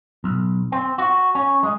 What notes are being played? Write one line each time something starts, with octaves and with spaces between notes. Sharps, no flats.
B1
C4
F#4
C#4
G#3